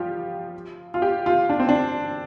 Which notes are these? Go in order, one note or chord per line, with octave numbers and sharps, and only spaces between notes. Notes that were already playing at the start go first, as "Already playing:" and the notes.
Already playing: F3 G3 F4 G4
F4
G4
F4
D4
C4
D4